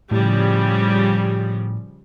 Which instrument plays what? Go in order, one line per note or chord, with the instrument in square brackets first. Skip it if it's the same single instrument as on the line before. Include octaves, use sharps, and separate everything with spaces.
[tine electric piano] A2 [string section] C#3 F3 G3